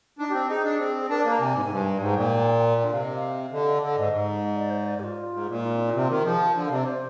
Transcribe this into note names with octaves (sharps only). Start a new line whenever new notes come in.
D4 D#4
G4
C4
D#4 G#4
D4
C4
G#4
D4 A#4
D5
A#3
A#5
C3 G#5
G#2
G#2
G2
G#2 G5
A#2
D3
C3 F5
D#5
F5
D3 D#5
F5
D#5
D3 D#5
G#2
G#2
D#5
D5
C5
D5
G4
F4
G#2
A#2
F4
D#4
C4
D#4
C3 F4
D#3
F3 G#4
D3
F5
C3
D5
C5